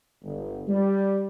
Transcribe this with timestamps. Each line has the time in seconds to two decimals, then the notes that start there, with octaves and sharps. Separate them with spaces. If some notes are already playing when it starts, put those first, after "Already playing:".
0.23 G1
0.67 G3